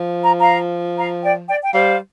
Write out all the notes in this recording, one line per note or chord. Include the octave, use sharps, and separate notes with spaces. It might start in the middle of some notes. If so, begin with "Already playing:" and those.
Already playing: F3
A#5
F5 A#5
F5 A#5
D5 G5
D5 G5
G5
G3 C5 F5